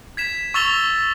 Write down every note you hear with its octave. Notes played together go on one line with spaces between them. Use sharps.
G#6 B6 E7
C#6 E6 A6 F7 G7